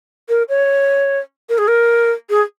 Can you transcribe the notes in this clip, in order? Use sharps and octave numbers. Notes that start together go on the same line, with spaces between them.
A#4
C#5
A#4
G#4
A#4
G#4